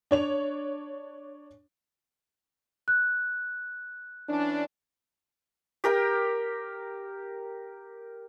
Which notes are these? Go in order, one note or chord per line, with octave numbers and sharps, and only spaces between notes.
D4 C#5 F7
F#6
E3 C#4 D4
G4 A#4 G5